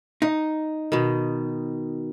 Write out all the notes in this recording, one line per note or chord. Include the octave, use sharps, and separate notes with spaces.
D#4
B2 D#3